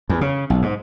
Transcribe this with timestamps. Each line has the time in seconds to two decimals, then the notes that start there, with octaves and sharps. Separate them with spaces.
0.09 E2
0.21 C#3
0.50 B1
0.62 G#2